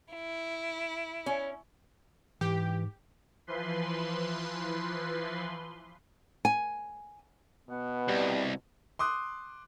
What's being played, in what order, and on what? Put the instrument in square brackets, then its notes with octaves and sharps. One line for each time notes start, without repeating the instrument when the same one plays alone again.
[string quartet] E4
[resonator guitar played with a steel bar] C#4
[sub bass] G#2 [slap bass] E3 [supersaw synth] G4
[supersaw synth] E3 F3 B4 C6
[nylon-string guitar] G#5
[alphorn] B2 [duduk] B3
[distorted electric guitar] C2 [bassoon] G3
[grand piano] C6 D6 D#6 F#6